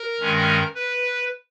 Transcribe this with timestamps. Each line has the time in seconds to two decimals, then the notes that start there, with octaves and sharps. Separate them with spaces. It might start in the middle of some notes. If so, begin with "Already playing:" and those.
Already playing: A#4
0.20 G2 D#3 G#3 C#4
0.75 B4